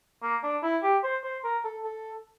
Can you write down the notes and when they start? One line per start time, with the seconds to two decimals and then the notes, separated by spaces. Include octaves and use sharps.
0.23 A#3
0.43 D4
0.63 E4
0.83 G4
1.04 C5
1.24 C5
1.44 A#4
1.64 A4
1.84 A4